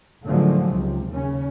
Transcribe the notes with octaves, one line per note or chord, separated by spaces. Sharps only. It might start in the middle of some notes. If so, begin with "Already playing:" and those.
A2 D3 D#3 F3 F#3 G#3
C#2 C3
D#2 C#3 C#4